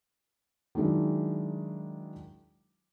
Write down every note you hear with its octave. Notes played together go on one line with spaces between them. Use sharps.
D#3 F#3 G#3 D4 E4